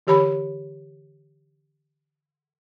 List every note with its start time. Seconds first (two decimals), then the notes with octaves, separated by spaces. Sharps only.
0.07 D3 E3 G4 C#5 B5